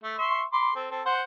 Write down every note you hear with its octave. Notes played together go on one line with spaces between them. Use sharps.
A3
E5 C6 C#6
B5 C6 D6
C4 A4
C4 A4
C5 F#5